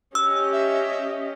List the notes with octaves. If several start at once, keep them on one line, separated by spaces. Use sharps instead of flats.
C#4 G4 D#5 E6
E5